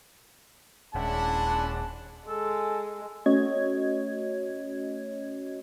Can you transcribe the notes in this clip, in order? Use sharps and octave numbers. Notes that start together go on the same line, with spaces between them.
D#1 G#3 C#4 D4 E4 F#5 A5
G#3 A4
A3 C#4 F#4 C#5 D#5 G#6